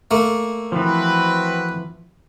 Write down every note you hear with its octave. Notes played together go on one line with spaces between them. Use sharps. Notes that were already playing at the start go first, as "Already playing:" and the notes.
A3 A#3
E3 F3 C4 F#4 B4